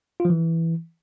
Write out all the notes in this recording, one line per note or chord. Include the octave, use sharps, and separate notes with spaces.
F4
F3
E3